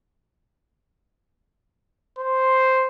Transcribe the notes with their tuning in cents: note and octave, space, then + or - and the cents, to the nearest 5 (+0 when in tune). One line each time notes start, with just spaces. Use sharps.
C5 +0